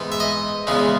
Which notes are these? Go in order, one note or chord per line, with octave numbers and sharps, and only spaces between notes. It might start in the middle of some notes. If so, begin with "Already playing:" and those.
Already playing: G#2 E3 B3
E5
D#5
E2 C#3 G#3 B3